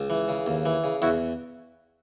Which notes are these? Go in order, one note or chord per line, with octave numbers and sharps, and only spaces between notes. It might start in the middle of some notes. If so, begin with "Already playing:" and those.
Already playing: C#2
E3
C#3
D#2
E3
C#3
E2 E4 F#4